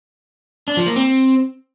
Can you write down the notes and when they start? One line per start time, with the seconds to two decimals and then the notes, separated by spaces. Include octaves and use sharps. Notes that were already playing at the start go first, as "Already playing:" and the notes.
0.68 D4
0.77 F3
0.86 A#3
0.96 C4